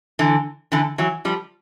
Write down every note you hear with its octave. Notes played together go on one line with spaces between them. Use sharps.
D3 E3
D3 E3
E3 F#3
F3 G3